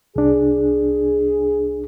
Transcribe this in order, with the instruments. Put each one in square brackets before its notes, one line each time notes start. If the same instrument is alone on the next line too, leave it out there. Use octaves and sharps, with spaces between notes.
[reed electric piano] C2 D4 [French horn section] G#4